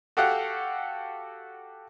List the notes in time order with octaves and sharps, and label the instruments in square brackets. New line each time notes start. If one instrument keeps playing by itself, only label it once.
[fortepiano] F#4 G4 A4 F5 F#5